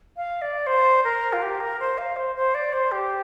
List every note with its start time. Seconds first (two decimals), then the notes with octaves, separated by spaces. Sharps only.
0.17 F5
0.42 D5
0.67 C5
1.04 A#4
1.33 F4
1.42 G4
1.60 A#4
1.80 C5
1.98 F5
2.16 C5
2.36 C5
2.54 D5
2.73 C5
2.92 G4